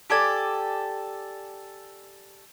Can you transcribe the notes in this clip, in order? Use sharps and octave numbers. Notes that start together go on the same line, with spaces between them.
G4 A4 D5 G#5